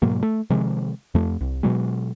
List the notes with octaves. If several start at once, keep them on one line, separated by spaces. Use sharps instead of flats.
G#2 B2 F#3 A#3
A3
C3 D#3 F3 G#3
F2 A3
C2
B2 F#3 G#3